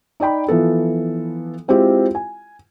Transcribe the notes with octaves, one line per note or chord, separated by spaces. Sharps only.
D#4 D5 G5 B5
E3 F3 B3 A4
G#3 C4 E4 F4 G4
G#5